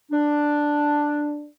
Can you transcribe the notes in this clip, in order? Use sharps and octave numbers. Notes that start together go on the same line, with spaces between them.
D4